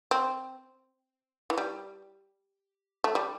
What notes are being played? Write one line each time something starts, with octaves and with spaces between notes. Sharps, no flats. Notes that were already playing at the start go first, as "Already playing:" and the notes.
C4
E3
G3
A3
G3